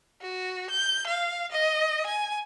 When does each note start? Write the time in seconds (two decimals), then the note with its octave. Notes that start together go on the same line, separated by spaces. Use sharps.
0.22 F#4
0.71 G6
1.07 F5
1.52 D#5
2.07 G#5